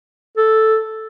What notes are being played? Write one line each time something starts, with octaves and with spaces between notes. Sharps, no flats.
A4